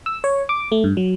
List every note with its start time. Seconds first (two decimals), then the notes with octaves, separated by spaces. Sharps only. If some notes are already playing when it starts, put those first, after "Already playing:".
0.06 E6
0.24 C#5
0.49 D6
0.72 A3
0.84 G2
0.97 F#3